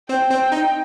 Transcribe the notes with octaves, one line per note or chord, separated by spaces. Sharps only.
C4 C5 G5
C4 C5
G5
D#4 D#5